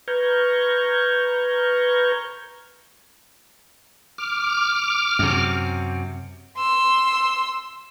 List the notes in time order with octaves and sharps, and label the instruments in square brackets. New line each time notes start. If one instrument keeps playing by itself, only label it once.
[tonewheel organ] B4 A#5 C#6 F6 G6 G#6
D6 F6
[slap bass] F#2 C3
[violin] C6 E6